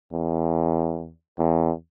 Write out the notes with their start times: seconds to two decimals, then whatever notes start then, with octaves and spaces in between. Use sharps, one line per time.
0.12 E2
1.39 E2